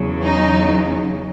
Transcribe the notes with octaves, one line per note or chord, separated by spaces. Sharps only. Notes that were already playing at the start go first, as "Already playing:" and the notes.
Already playing: E2 C#3 F#3
D#4